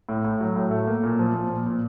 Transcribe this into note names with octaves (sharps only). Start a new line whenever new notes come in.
A2
A2
F#3
A2
A3
A#3
A#2
F3
A#2
A#2
A#2